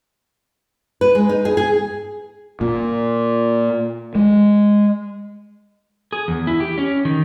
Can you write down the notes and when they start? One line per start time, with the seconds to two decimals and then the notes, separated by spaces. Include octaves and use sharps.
1.01 B4
1.15 G#3
1.29 D#4
1.45 G#4
1.57 G#4
2.61 A#2
4.15 G#3
6.13 G#4
6.28 E2
6.47 E4
6.60 G4
6.78 C#4
7.05 D#3